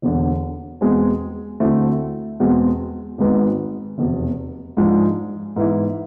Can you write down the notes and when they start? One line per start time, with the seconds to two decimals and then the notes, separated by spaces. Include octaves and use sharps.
0.02 E1 E2 D3
0.81 E2 B2 G#3 C4 G#4
1.60 D2 D3 A3 C4 E4
2.40 E2 B2 G#3 C4 G#4
3.18 G#1 G#2 G#3 B3
3.98 F1 E2 B2
4.77 G#2 F3 G#3 D4
5.56 G#2 E3 B3 E4